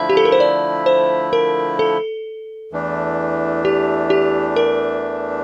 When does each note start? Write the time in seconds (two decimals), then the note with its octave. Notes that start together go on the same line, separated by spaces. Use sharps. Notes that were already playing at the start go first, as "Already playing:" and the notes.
Already playing: D3 F3 A3 E4 E5
0.10 G4
0.17 A4
0.25 A#4
0.32 C5
0.40 D5
0.86 C5
1.33 A#4
1.79 A4
2.72 E2 E3 A3 D4
3.65 G4
4.10 G4
4.56 A#4